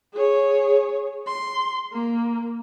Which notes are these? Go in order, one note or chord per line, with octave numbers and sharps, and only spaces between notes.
G#4 C#5
C6
A#3